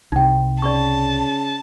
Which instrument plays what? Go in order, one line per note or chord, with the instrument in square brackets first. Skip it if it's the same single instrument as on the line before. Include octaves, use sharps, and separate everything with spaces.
[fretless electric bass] C2 C3 [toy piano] D#4 G5
[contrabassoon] C#3 [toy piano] D5 B5 C#6 [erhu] A5